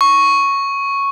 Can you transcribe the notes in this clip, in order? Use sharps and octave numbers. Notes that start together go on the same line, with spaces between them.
C#6